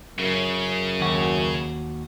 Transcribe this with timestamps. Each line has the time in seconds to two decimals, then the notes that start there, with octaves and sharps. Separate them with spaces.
0.19 F#2 C#3
1.00 D#2 F#4